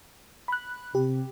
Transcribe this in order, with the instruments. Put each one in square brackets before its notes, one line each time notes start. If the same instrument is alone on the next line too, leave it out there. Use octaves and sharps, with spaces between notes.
[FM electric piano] B5 F#6
[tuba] C3 [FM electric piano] G4